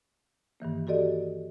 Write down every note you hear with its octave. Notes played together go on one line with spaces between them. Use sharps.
G2 D#3 E3 A#3
F#4 G4 A4 D5 D#5